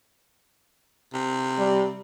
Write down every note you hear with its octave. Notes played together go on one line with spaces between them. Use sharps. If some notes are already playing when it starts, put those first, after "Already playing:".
C3
G3